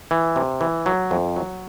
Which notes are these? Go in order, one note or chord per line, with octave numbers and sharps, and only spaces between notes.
E3
C3
E3
F#3
F2
F#3